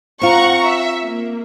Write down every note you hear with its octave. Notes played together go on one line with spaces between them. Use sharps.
C4 F4 F#5 A#5 C#6
E5
A#3